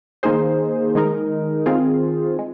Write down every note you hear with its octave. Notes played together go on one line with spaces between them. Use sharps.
D#3 A#3 D#4 G#4 C5
D#3 G#3 D#4 A#4
D#3 C4 F4 G#4
G#3